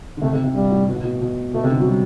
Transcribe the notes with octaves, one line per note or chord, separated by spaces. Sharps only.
D3
C3 A3
C3
C3
G2 G3
A2
B2
A2
B2
B2
B2 A3
C3
D3
F#3
G3